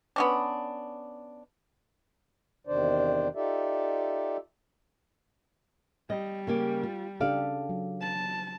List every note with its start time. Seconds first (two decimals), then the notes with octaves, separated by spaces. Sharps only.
0.16 B3 C#4 D4
2.67 E2 C3 D#3 D4 C5 D5
3.35 D#4 F4 G4 A4 D5 E5
6.10 G3 D#5
6.47 C#3 A#3 G4
6.83 F4
7.20 C#3 D4 G4 A4 D5 F5
7.69 F#3
8.01 A5